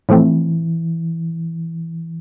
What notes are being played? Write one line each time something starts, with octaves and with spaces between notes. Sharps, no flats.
A2 E3 F3 A3 C4